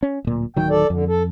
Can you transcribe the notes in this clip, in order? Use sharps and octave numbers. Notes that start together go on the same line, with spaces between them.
C#4
D1 A#2
D1 D#3 F#3 G5
A4 D5
F2 D3
A4